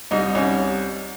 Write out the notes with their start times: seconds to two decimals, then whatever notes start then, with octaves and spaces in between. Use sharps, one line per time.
0.11 C2 D#4
0.35 C2 C#4